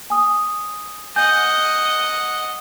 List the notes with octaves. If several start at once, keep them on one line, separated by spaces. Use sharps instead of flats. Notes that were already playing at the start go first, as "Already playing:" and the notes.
G#5 D#6
D#5 F#5 G#5 G6